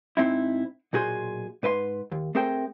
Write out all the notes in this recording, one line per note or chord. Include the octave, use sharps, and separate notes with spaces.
G#2 C4 D#4 E4
B1 A#2 F#4 G#4 C5 C6
G#2 B4 D#5 C6
D#2
A3 C4 G#4 A#4 C5 G5